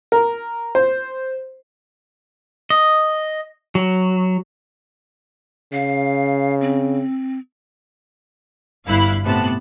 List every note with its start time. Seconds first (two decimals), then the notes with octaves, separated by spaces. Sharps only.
0.12 A#4
0.75 C5
2.70 D#5
3.75 F#3
5.73 C#3 F5
6.61 C4
8.87 G1 G2 E4 F5 B5 F#6
9.25 A2 C3 B3 A5 F#6